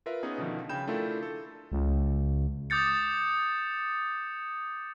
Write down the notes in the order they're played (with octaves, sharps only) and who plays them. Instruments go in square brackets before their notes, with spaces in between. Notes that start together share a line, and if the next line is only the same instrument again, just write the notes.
[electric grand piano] F4 A#4 B4 E5
B3 C#4 D#4 G#4
B2 D3 D#3 F3
C#3 G5 B5 G6 E7
A3 D4 E4 F4 A4 A#4
A4
[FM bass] C#2
[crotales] D6 D#6 G6 A6 C#7